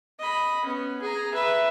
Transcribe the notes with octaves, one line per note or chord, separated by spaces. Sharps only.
D#5 B5
B3 C#4
G#4 A#5
B4 E5